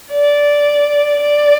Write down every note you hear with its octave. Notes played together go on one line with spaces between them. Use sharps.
D5
D5